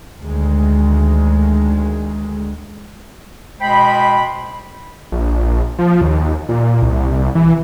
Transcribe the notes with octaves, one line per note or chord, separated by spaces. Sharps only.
D2 D#3 G#3
B2 G#3 C5 G5 B5
A#1
F3
D#2
A#2
C2
E3